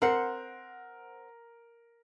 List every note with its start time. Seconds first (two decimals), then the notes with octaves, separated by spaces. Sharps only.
0.02 C4 A#4 C5 F#5